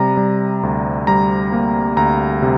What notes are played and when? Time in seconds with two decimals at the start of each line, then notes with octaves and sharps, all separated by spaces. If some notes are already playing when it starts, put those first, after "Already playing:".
Already playing: C3 G3 A#5
0.17 G3
0.63 D2
1.07 G3 A#5
1.52 A#3
1.97 D2 A#5
2.42 C3